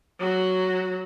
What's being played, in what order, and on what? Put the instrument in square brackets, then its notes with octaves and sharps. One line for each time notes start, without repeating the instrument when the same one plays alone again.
[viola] F#3 F#4